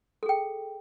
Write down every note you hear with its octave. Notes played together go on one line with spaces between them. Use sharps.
G#4 A4 G5